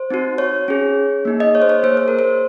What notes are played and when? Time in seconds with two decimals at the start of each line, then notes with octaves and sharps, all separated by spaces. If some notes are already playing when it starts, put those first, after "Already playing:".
Already playing: C5
0.10 C4 D#4 F#4
0.38 C#5
0.68 C#4 G#4
1.25 A#3 D#4 G#4
1.40 D#5
1.55 C#5
1.62 C5
1.69 C#5
1.83 A#3 D#4 G#4 C5
1.97 C5
2.08 A#4
2.19 C5